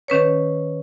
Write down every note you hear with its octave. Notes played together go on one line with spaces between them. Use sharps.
D#3 C#4 B4 C#5